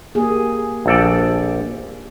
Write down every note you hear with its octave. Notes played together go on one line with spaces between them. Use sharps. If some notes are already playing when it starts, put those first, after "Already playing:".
A#3 G4 G#4
A#1 A4 D5